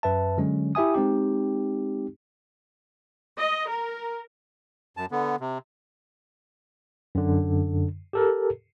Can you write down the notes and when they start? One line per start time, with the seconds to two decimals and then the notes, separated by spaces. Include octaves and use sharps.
0.03 F#2 B4 E5 A5
0.38 D3 F#3 G#3 C#4
0.75 E4 G4 E5 G#5 D#6
0.94 G#3 C4 D#4 G4
3.38 D#5
3.69 A#4
4.97 F#2 A5
5.11 D3 B3
5.40 C3
7.15 F#2 D3
8.13 G4 A4 A#4